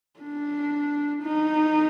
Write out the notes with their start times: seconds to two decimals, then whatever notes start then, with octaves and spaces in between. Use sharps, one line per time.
0.20 D4
1.23 D#4